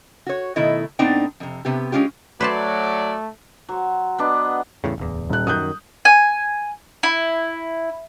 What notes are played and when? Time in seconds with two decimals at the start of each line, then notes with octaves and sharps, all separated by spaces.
0.27 F#4 C#5
0.56 B2 D#3 A3 E4 D#5
0.99 A2 B3 C4 D4 D#4 G5
1.40 F2 C3
1.65 C3 B3 G4
1.92 G#3 A3 C#4 F4 G4
2.41 F#3 A3 B4 C5 D5 A5
3.69 F#3 C5
4.18 B3 D4 D#5
4.84 E2 A2 C#3
4.98 D1 E2
5.30 D#1 F#6
5.47 F#2 D#3 D#6 F#6 G6
6.05 G#5
7.03 E4